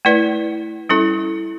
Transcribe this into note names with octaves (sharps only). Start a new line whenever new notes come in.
A3 E4 B4 D5
G3 C#4 E4 A4